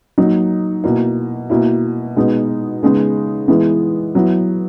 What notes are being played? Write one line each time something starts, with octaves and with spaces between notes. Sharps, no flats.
F#3 A#3 D#4
B2 A#3 E4
B2 A#3 E4
B2 G#3 B3 D#4
C#3 G#3 B3 D#4
E3 G#3 B3 E4
F#3 B3 E4